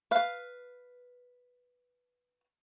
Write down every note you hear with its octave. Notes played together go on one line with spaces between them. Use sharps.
B4 F5